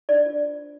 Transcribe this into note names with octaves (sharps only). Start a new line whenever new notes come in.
D4 D5
F4 C5